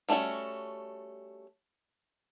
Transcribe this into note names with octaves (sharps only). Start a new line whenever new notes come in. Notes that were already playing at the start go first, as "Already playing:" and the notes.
G3 A3 C#4 E4 F#4